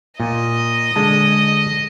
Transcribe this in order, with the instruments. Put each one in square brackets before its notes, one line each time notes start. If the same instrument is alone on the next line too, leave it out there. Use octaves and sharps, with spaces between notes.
[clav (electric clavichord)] A#2 [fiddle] D#5
[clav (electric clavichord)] D3 G#3 A5